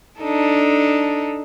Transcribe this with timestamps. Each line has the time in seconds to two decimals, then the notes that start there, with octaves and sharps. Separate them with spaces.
0.20 D4 D#4 A4